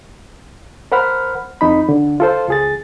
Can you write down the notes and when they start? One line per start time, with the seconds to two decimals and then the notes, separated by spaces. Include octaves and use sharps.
0.92 A#4 C5 F#5 B5 F6
1.61 F2 D#4 B5
1.89 D3
2.20 F4 A4 C5
2.48 C#2 G#4 A6